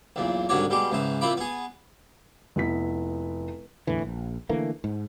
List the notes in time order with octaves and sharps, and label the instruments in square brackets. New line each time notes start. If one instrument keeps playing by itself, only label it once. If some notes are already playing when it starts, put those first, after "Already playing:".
[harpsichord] B1 E2 A#2
C2 G#2 D3 F#4 C#5 D5
B2 G3 G#3 D6
C#2 G#2 E3 C5
A#2 C4 E4 F4 B5 D6
B3 G#4
[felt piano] F1 B3 E4 B6
[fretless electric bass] E2 A2 D3 E3
A#1
D3 E3 A3 A#3
G#2